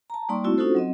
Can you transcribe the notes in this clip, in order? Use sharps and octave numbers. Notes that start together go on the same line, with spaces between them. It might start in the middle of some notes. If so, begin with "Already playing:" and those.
A5 A#5
G3 A#3 D#4 D5 C6 C#6
A3 C4 E4 F#4
C#4 D#4 F4 F#4 A4 C5
F#3 C4 D#5